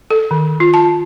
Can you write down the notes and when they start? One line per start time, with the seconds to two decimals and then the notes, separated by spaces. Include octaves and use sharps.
0.10 A4
0.31 D#3
0.60 F4
0.74 A5